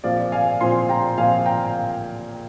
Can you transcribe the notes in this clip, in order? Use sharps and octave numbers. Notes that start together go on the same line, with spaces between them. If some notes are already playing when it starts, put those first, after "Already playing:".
A#2 F3 C4 D5 F5
F5 G#5
A#2 F3 C4 G#5 C6
G5 A#5
A#2 F3 C4 F5 G#5
G5 A#5